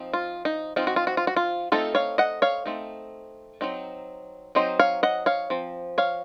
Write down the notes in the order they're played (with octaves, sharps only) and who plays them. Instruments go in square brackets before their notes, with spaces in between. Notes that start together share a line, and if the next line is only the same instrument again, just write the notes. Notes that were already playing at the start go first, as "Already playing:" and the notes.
Already playing: [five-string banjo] F3 C4 D#4
F4
D#4
F3 C4 D#4 F4
F#4
F4
F#4
F4
F#4
F4
A3 C4 D#4 F4 A4
C#5 F5
D#5 F#5
C#5 F5
A3 C4 D#4
F#3 C4 D#4
F#3 C4 D#4 C5 D#5
C#5 F5
D#5 F#5
C#5 F5
F3 C4
C#5 F5